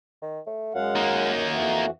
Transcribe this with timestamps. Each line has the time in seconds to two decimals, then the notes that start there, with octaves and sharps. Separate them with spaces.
0.22 D#3
0.47 A3
0.75 F#2 G#3 F5 F#5
0.95 A#3 D#4
1.47 F2 E3 F#4